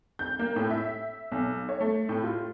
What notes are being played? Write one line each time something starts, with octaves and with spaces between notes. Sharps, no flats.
G6
A#3
A2
E5
B1
C#5
A3
A2
F4